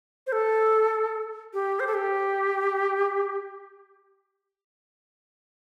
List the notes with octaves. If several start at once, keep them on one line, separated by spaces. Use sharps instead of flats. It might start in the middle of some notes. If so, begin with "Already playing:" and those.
C5
A4
G4
C5
A4
G4